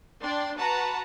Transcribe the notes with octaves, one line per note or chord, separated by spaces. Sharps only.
D4 D5 G5 C6
F#4 B4 F#5 A5 A#5